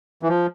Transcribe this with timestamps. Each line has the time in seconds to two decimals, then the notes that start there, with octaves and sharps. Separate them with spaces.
0.23 E3
0.28 F3